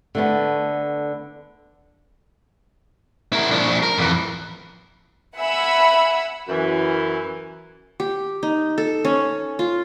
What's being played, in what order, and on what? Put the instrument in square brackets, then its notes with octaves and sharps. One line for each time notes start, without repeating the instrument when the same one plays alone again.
[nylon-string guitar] D3 A3 B3
[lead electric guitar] E4 A#4
F3 D4
A#4
F2 E3
[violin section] E5 F#5 G#5 B5 E6
[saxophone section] F#2 E3
[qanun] G4
D#4
A4
C#4
F4